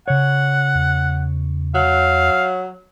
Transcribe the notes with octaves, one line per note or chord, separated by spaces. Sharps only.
C#3 C#5 F#5
E2
F#3 F5